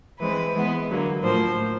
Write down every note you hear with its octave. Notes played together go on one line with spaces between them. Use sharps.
E3 G#3 C4 B4
E3 G#3 B3
D3 F#3 A#3
A2 F3 A#3 C5